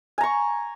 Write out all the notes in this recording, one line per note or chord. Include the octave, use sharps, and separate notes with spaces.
G#5 A#5 C#6